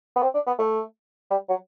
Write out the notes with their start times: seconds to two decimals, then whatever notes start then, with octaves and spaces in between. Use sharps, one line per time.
0.16 B3
0.22 C4
0.34 D4
0.47 B3
0.58 A3
1.31 G3
1.49 F#3